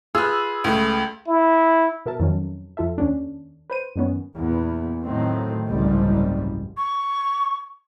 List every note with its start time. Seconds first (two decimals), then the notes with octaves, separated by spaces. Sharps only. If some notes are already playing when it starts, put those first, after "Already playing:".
0.15 F4 G#4 B4 E6
0.64 C#2 A3
1.28 E4
2.06 B2 A#4 E5 A5
2.20 F2 D#3 F#3 C#4
2.77 F2 F4 A4 E5
2.98 D#2 C#4 D4
3.70 B4 C5 D#7
3.96 F#2 D#3 B3 C#4
4.37 E2 A#2 B3
5.04 A2 D#3 F#3 A3 C4
5.68 F#1 C2 G#2 F3 G3
6.77 C#6